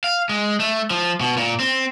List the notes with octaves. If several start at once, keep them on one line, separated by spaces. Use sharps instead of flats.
F5
G#3
A3
F3
B2
A#2
C4